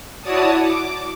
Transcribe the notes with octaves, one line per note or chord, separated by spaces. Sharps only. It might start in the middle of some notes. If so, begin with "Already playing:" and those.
E4 F#4 C#5 D5 A5 D#6
D6